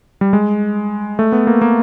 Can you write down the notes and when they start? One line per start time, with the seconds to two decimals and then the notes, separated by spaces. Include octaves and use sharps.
0.21 G3
0.33 G#3
1.19 A3
1.32 B3
1.47 A#3
1.62 A#3